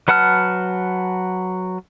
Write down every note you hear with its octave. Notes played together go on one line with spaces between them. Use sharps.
F#3 B4 F#5 A5 F6